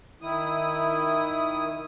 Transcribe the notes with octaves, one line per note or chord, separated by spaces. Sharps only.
D#3 E4 D#6